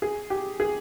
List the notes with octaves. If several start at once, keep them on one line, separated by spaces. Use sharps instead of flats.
G#4
G4
G#4